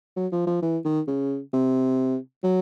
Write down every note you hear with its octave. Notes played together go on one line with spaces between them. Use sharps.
F#3
F3
F3
E3
D#3
C#3
C3
F#3